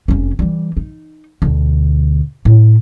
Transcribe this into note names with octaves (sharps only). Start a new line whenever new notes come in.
F1 C#4
E3 G3
D#4
D2 B2
A2